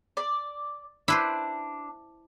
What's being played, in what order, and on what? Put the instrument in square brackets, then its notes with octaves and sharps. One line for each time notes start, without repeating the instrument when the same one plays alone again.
[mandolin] D5
[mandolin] D4 [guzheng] E4 B4 C5